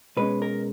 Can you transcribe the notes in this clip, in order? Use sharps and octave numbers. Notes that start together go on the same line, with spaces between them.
B2 G#3 C#4 B4
A#4